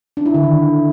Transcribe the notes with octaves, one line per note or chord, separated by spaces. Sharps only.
D4
E4
D3
D#3